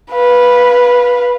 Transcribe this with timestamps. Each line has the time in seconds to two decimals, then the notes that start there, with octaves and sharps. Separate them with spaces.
0.11 B4 F5